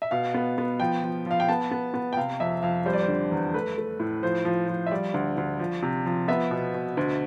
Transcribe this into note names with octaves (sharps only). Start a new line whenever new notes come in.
E5
B2 F5
B3
B3
F3 G5
F3
F3 F5
G5
B3 A5
B3
B3
G5
C3 F5
F2 E5
F2 F5
G3 C5
D5
C5
D3
E2
A3 B4
A3
A2
F3 C5
F3
F3
E5
G3 D5
D2
D2
F3
C3
F3
B3 E5
B2
B2
D2